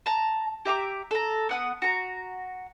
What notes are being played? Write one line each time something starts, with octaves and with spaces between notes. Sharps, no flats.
A5 A#5
G4 E5 A#5 D6
A4 A#5
B3 F#5 D#6
F#4 A#5